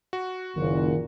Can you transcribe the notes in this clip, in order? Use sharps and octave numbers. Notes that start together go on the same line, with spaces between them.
F#4
F#1 A#2 D#3 A#4